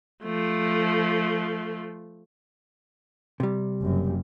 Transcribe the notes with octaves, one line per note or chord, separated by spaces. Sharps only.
F3 A3
C3 G3
F#1 F#2